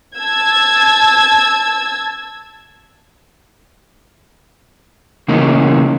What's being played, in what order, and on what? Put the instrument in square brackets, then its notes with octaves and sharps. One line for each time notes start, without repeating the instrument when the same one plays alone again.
[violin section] A5 E6 G#6
[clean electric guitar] C#3 E3 A3 A#3 C#4 D#4